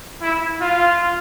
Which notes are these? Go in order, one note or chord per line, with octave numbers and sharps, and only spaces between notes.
E4
F4